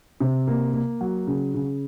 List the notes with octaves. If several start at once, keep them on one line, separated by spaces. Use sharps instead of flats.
C3
A#3
A#3
F#3
C#3
C#3